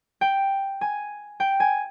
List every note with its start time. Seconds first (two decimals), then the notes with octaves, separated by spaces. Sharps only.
0.21 G5
0.81 G#5
1.40 G5
1.60 G#5